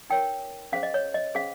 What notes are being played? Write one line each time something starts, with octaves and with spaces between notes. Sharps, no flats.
D#4 A#4 C#5 G5
C#4 G#4 C5 F5
D#5
C#5
D#5
C#4 G#4 C5 F5